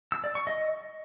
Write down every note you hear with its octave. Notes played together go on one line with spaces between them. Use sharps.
E6
D5
C#6
D#5